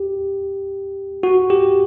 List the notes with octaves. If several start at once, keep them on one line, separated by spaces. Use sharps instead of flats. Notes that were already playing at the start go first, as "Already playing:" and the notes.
Already playing: G4
F#4
G4